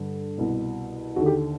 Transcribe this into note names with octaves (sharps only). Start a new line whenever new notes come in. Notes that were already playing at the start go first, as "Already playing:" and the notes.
Already playing: G2 D3
C2 B2
D#2 D3 F#4
G4